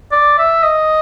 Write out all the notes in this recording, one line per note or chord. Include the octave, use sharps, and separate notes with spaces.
D5
E5
D#5